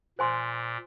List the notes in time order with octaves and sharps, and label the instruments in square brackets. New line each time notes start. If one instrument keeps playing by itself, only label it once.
[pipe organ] A#2 [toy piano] C5 G#5 C6